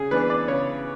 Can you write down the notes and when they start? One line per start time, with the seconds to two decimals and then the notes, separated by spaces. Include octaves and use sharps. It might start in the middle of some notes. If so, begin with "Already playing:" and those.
Already playing: C#3 G#4
0.11 E3 B3 D4 B4
0.30 D5
0.48 C#3 C#5